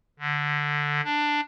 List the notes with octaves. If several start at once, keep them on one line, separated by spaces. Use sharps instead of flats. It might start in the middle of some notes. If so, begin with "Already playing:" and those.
D3
D4